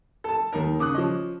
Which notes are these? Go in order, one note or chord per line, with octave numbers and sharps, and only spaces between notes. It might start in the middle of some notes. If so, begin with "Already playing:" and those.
A4 A5
D#2 D#4 A#4
C#3 D6 D#6 F#6
F3 C#4 D#5